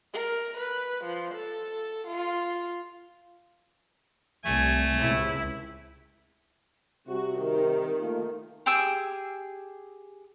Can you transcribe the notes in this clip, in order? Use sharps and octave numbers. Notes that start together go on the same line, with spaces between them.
A#4
B4
F3
A4
F4
C2 A3 G#5
C#2 C3 E4
C3 G3 F#4
D#3
A3 A#3 F4
G4 G#4 D6 E6